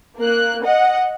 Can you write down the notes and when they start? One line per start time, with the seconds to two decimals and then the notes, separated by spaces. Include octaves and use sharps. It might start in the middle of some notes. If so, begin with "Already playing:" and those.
0.19 A#3 F#6
0.64 D#5 F#5